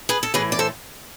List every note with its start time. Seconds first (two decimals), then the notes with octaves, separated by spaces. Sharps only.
0.09 G#4 B4
0.23 A4
0.34 A2 E3 G#4 B4
0.52 D5
0.59 A4 C5